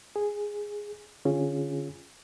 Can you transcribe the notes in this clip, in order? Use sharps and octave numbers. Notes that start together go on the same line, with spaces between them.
G#4
D3 C#4 F4 G#4